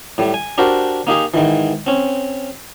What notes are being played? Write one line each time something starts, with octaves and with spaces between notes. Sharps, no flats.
A2 G3
G#5
D4 F#4 G4 A#4 C5
A#3 D#4 G4 G#4
G#2 D#3 E3
C4 C#4